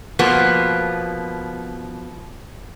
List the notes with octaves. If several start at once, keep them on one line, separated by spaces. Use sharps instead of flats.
B2 F3 A#3 B3